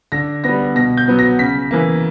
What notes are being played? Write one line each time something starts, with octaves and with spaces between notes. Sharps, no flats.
D3 A#6
G3 B3 A#6
B2 A#6
G6
F#3 B3
A#6
C#3 B6
E3 A#3